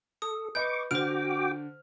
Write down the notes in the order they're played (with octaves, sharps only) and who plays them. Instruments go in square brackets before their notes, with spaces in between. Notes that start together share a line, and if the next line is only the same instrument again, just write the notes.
[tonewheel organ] A4 [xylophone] D#6
[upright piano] B4 D#5 [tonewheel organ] C#6 D6 [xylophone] G6
[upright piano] D3 F6 [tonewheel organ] F#4 G5 D6 [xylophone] C5 D7